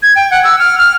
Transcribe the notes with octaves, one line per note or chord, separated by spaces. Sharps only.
G#6
G5
F#5
E6
F6
F6